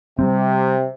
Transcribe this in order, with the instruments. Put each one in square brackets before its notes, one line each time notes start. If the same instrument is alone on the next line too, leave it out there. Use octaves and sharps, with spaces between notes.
[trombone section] C3 [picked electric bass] G3 G#3 C4